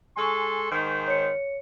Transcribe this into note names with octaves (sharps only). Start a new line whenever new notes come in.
G#3 A4 G#5 C6 C#6
G#2 D#3 C5
C#5 C#7